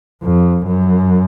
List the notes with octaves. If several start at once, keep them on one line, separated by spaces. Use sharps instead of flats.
F2
F#2